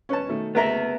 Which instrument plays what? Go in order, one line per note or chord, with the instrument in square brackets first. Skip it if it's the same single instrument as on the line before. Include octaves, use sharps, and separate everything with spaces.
[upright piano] E1 B4 C#5 [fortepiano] C#4 A5
[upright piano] B2 D#3 A3
[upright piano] F#1 D2 [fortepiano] A3 A#4 A#5 [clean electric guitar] B3 E5